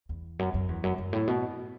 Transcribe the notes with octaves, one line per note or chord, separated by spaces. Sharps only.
E2
F#2
F#2
E2
F#2
F#2
A2
B2